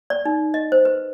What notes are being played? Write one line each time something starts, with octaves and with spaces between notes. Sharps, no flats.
D5
D#4
D#5
C5
B4